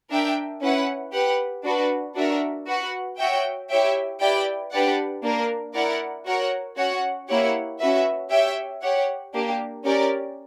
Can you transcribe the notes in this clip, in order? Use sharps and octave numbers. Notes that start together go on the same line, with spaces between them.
D4 A#4 E5 G5
C#4 E4 B4 F#5
G4 B4 F#5
D4 F#4 B4
D4 F#4 A#4 E5
F#4 B4 F#5
F#4 C#5 E5 G5
E4 G4 C#5 E5 G5
E4 G4 B4 D5 G5
D4 G4 B4 D5 F#5
A#3 D4 A#4
E4 A#4 D5 F#5
F#4 A#4 C#5 F#5
C#4 F#4 C#5 F#5
A#3 E4 G4 C#5 F#5
C#4 F#4 B4 E5
G4 C#5 E5 G5
G4 C#5 F#5
A#3 D4 G4
C#4 G4 A#4 D5